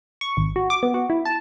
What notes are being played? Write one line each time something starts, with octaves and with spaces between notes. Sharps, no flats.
C#6
G#1
F#4
D6
B3
F#4
E4
A5